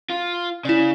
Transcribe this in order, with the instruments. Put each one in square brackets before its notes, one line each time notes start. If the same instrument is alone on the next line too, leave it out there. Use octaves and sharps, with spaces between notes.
[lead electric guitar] F4
[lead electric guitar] C#3 [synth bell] E4 D5